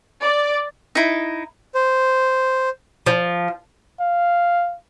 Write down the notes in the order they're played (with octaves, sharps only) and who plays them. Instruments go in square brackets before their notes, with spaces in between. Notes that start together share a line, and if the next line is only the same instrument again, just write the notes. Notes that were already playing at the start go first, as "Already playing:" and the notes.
[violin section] D5
[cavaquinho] D#4 E4
[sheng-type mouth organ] C5
[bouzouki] F3
[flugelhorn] F5